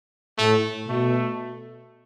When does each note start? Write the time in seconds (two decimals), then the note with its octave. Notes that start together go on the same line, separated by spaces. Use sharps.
0.38 A2 A3
0.88 B2 A3